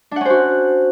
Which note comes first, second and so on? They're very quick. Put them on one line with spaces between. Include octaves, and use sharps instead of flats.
D4 F#5 C#4 C5 F#4